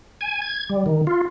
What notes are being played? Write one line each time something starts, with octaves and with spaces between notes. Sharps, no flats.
G#5
G#6
G3
D#3
F4